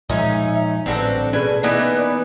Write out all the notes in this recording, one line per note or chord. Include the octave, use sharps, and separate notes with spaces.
A#2 F3 G#3 C#4 D#4 E5
A1 D3 G3 C4 F#4 A4 B4
B2 C#4 G#4 B4 D5 G#5
E3 A#3 B3 D#4 E4 D5